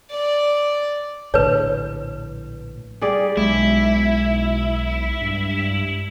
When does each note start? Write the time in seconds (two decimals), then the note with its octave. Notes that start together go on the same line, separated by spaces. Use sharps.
0.11 D5
1.34 A#1 A2 D3 B4 C#5
3.01 G3 G#4 D5
3.37 B1 G#3 E4
5.21 G2